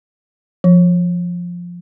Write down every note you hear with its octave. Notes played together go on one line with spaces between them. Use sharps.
F3